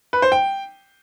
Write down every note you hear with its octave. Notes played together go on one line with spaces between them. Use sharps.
B4
C5
G5